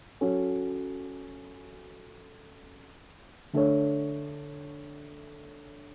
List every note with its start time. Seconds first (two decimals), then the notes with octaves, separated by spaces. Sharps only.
0.21 F#3 C#4 F#4 A4
3.53 D3 A3 D4 A4 C#5